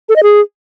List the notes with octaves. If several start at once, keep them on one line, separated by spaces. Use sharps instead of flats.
A4
D#5
G#4